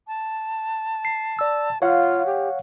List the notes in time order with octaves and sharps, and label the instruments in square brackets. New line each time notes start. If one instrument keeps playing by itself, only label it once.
[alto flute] A5
[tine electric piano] C7
D5 E6
[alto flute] F4 [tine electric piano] C#5 F5 F#5
[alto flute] G4